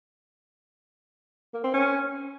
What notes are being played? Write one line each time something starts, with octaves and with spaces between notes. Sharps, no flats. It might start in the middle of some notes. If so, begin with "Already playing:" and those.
A#3
C4
C#4